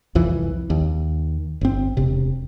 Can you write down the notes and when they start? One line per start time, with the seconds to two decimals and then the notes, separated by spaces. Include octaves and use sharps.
0.15 C2 F2 E3
0.70 D#2
1.61 G1 C4
1.97 E1 C3